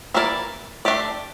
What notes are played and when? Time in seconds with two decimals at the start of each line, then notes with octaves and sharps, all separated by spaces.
0.14 E3 A#3 E4 A#4 D5
0.85 A3 D4 G4 D5